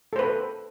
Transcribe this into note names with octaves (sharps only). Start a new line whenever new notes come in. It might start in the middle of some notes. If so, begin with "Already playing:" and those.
A4 B4 C5